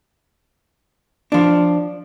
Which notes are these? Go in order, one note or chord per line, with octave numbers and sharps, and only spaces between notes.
F3 D4